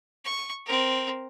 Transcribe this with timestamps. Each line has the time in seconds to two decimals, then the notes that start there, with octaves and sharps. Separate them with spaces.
0.25 C#6
0.66 C4 A#4